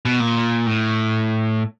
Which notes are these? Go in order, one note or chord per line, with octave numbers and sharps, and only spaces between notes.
B2
A#2
A2